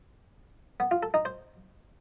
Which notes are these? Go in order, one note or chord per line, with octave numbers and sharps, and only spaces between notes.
B3
F4
A4
D#4
C5